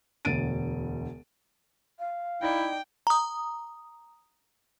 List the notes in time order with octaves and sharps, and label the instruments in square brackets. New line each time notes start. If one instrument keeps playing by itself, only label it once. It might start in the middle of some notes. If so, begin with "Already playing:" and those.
[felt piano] E1 D2 A6 D7 D#7
[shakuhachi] F5
[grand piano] D#4 D5 [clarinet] E4 [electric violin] G5
[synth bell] A#5 D#6